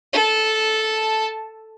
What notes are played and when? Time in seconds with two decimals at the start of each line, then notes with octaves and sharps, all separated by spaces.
0.13 A4 A5